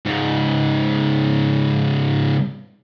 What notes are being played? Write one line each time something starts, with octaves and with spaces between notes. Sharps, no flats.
G#2 C#3